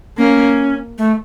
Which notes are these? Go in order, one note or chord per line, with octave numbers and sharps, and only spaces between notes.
A#3 C#4
A3